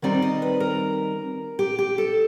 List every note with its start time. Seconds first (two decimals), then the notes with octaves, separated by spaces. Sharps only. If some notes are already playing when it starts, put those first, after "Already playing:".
0.02 D#3 G3 C4 D#4 D5
0.22 D#5
0.42 B4
0.60 A#4
1.59 G4
1.79 G4
1.98 A4